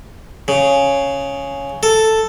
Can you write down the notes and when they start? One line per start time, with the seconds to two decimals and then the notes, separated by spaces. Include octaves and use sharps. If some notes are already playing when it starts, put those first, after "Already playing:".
0.48 C#3
1.83 A4